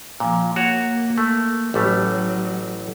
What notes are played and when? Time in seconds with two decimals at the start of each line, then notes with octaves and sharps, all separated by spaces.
0.20 A#2 F3
0.56 A#3 F#4 C#5
1.18 A3
1.74 A1 F#3 G3 A3